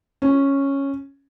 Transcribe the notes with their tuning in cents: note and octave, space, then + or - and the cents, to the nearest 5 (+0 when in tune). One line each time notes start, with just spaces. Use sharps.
C#4 -5